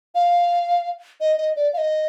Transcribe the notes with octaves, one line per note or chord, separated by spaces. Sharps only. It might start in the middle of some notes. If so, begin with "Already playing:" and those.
F5
D#5
D#5
D5
F5
D#5